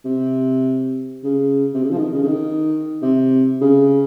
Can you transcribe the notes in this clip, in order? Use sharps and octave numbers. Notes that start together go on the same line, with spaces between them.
C3
C#3
C3
C#3
F3
D#3
C#3
C#3
D#3
C3
C#3